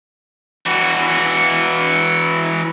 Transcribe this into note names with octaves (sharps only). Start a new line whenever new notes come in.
E3 F#4